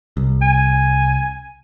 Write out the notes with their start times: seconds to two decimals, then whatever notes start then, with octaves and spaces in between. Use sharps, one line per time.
0.17 C2
0.42 G#5